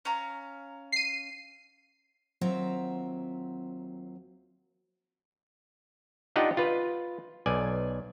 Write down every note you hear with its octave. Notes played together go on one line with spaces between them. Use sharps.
C#4 F5 A#5
C7 D#7
D#2 F#3 C4 F4 E5 A#5
D4 D#4 F4 G4 D#5 F#5
F4 B4
B1 D5 G#5